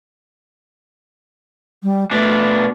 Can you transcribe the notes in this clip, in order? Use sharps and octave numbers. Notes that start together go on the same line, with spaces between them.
G3
B2 A3 D4